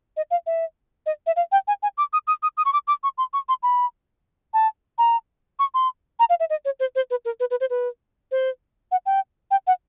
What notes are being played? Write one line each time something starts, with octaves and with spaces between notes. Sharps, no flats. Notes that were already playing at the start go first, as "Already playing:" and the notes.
D#5
F5
E5
D#5
E5
F5
G5
G#5
G#5
D6
D#6
D#6
D#6
D#6
C#6
D6
D6
C#6
C6
C#6
C6
B5
A5
A#5
C#6
C6
A#5
F5
E5
D#5
C#5
C5
C5
B4
A#4
B4
B4
C5
B4
C5
F#5
G5
G5
F#5